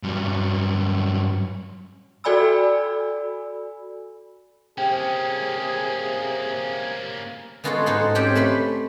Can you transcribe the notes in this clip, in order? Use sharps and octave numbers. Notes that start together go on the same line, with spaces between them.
G2 F#3
F#4 A4 D5 G#5 B5 E6
C3 A#3 C#4 G#4 G5
G#3 B3 F4 F#4 G#4 A4
G#2 D#4 A4 F#5 C6
C4 C#4 G4 C#5 G5
A3 B4 B5 C6